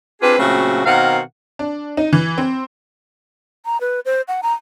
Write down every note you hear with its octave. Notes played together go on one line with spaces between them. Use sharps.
C4 D4 F4 G4 G#4 B4
A#2 C#3 F#3 A3 C4 F#4
B2 D#3 C4 A#4 F5 F#5
D4
D#4
E3
C4
A#5
B4
C5
F#5
A#5